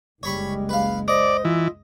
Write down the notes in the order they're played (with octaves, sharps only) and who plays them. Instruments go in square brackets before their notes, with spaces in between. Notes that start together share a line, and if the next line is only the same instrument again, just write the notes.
[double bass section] F#1 C#2 G#3 [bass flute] G3 [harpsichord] C#5 B5 C#6
[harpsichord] B4 F5
[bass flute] C5 [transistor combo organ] D5 [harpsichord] D#5
[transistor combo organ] E3 [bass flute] F4